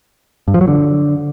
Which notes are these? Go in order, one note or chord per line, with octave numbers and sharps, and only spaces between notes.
G2
F3
F#3
D3